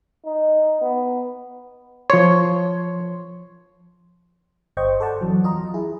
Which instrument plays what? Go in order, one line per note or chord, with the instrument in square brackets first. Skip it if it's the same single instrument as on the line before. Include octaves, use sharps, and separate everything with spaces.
[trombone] D#4
B3
[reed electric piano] F3 C6 [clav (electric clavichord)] C#5
[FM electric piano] G1 C5 D#5 G5 C#6
A4 C5 D5 F#5 A5
F#2 E3 F#3
E2 F4 D#5 A#5
E4 G#4